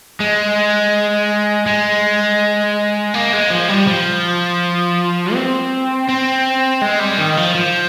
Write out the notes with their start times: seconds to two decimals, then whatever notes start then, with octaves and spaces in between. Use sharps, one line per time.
0.20 G#3
1.66 G#3
3.14 A#3
3.33 G#3
3.50 F3
3.68 G3
3.88 F3
5.34 C4
6.09 C4
6.81 G#3
6.99 G3
7.18 D#3
7.37 F3
7.55 F3